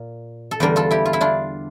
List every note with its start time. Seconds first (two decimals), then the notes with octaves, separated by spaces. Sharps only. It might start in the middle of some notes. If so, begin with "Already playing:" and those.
Already playing: A#2
0.51 A4
0.60 E2 D3 G3 G4 A#4
0.76 F4 A4
0.91 E4 G4
1.05 F4
1.13 E4
1.21 D4 F4